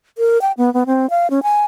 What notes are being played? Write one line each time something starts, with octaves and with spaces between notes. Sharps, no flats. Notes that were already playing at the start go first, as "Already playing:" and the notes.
A#4
G5
B3
B3
C4
F5
C#4
G#5